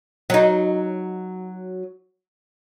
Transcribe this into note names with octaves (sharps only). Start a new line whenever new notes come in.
F#3 D#4